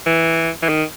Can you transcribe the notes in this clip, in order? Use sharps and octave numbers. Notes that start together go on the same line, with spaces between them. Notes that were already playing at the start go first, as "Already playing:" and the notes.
E3
E3
D#3